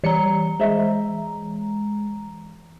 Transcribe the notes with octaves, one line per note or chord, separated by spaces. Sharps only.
E3 G3 D5 A#5 C#7
G#3 C5 D#5 E5